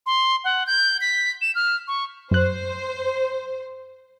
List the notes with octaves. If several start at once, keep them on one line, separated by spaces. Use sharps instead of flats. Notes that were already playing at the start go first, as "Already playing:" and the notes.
C6
F#5
G6
B6
E7
F6
C#6
F#2 C5 F#6